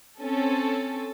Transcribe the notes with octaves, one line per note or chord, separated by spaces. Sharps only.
C4 C#4 A4